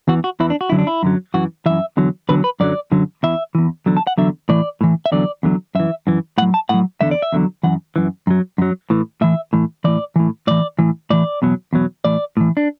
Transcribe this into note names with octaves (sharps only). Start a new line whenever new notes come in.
E2 E3 F#4
F#4
E2 E3 E4
D4
F#4
F#2 D3 F#3 E4
D4
E4
F#2 D3 F#3
F#2 E3 F#4
F#2 E3 E5
E2 D3 F#3
E2 D3 F#3 B4
B4
F#2 D3 F#3 D5
F#2 D3 F#3
E2 E3 E5
E2 E3
E2 D3 F#3
A5
F#5
E2 D3 F#3 E5
A2 E3 D5
A2 E3
E5
E2 D3 F#3 D5
E2 D3 F#3
F#2 E3 E5
F#2 E3
A2 F#3 F#5
A5
A2 F#3 F#5
E2 D3 F#3 E5
D5
E5
E2 D3 F#3
F#2 E3 F#5
F#2 E3
F#2 F#3
F#2 F#3
A2 E3
A2 E3 E5
A2 E3
A2 E3 D5
A2 E3
A2 E3 D5
A2 E3
A2 E3 D5
E2 B2 F#3
E2 B2 F#3
A2 E3 D5
A2 E3
D4